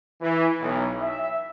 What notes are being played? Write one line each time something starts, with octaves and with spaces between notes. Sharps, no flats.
E3
B1
E5